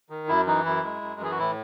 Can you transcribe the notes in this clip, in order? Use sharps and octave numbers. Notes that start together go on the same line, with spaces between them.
D#3
F#2 E4
E3 D#4
F#2 E4
G#3
F#2
E3 G#4
F#4
A2 E4